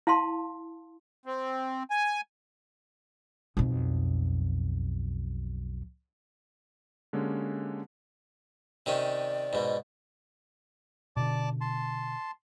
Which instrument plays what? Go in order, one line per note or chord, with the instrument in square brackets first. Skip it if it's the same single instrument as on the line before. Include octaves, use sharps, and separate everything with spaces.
[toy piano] E4 F5 A5 C6
[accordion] C4
G#5
[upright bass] B1 F2
[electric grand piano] D3 G#3 A#3 C#4 G4
[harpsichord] C3 D#3 C#4 [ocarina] D5
[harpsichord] G#2 B2
[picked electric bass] B2 D3 [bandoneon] D5 A5 D6
[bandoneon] A5 C6